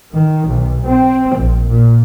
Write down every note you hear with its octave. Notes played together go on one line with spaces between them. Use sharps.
D#3
B1
C4
A#1
A#2